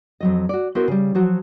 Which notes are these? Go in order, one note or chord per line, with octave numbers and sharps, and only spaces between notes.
F2 F#3 D#5
F#4 D5
B3 E4 F#4 A4 A#4 C5
C#3 G3
F3 F#3 F#4